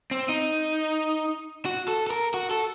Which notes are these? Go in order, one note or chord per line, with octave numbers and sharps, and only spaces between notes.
C4
D#4
F#4
A4
A4
A#4
F#4
A4